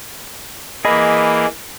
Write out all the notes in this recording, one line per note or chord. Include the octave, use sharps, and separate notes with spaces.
E3 A#3 G#4 D#5 B5